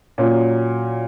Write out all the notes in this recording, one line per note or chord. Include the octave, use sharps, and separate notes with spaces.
A#2 F#3 C#4